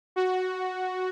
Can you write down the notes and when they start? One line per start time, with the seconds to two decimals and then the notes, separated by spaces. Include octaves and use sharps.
0.16 F#4